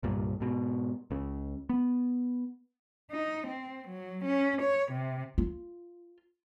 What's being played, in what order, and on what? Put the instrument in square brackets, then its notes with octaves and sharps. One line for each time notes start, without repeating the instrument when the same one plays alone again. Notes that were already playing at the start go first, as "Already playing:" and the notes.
[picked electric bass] C2 G2 A#2
G#2 B2
C#2 C#3
B3
[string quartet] D#4
C4
F#3
C#4
C#5
C3
[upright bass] F4